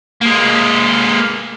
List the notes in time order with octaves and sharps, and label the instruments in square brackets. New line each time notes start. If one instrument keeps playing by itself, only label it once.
[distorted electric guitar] G#3 A#3